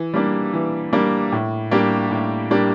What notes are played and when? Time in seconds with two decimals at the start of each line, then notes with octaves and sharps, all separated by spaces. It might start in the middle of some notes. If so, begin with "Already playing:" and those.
Already playing: E3
0.14 G3 A#3 D4
0.53 E3
0.93 G3 A#3 D4
1.32 A2
1.71 G3 A#3 D4 G4
2.11 A2
2.51 G3 A#3 D4 G4